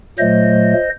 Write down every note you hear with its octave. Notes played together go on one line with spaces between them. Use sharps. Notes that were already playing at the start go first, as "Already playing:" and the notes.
A#2 F#3 A3 C5 D#5